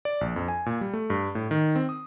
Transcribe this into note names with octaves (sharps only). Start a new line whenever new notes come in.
D5
A#1
F2
G#5
A#2
G3
A3
G2
A2
D#3
C4
D#6